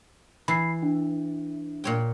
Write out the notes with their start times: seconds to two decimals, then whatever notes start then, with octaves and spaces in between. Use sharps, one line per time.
0.48 E3 B5 C7
0.82 D4
1.84 A#2 C#5 G5